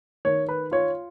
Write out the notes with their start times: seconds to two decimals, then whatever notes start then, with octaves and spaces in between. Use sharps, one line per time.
0.25 D#3 C#5
0.49 B4
0.72 F4 C#5